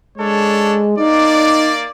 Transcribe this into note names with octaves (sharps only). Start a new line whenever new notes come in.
G#3 D4 A4 C#5
A#3 D#4 D5